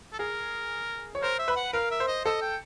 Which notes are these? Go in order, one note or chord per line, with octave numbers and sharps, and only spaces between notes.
A4
G#4 A#4
C#5
A#4 C5
E5
B4
F#5
A#4 F5
E5
C5
D#5
A4 D#5
G5